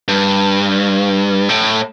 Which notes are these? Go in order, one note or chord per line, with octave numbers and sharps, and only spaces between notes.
G2
A2